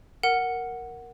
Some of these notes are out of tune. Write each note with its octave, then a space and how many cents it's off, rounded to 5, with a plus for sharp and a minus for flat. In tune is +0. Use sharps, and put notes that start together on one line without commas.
A#4 +0 F#5 +0